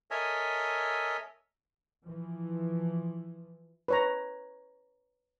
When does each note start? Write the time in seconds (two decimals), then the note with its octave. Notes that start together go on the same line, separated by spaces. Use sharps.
0.11 A4 A#4 C#5 D#5 E5 G#5
2.03 E3 F3
3.88 B4 C#5 A#5